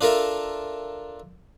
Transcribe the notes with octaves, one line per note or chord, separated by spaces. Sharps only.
D4 F4 A4 A#4 E5